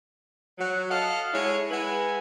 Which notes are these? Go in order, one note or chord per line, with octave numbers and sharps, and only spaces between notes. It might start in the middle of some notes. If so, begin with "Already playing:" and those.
F#3
A4 D#5 F5 F#5 A5
G#3 E4 C#5
G#3 E4 B4 F#5 G#5